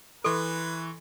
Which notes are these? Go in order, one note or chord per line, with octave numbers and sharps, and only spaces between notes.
E3 A4 B4 C6 C#6